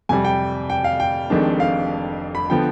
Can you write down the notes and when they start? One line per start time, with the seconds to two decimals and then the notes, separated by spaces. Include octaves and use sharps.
0.09 F2 C3 G3 G#5
0.25 G5
0.70 G5
0.84 F5
1.00 G5
1.30 F1 F2 D#3 G#3 D4
1.60 F5
2.35 B5
2.50 D3 F3 B3 G5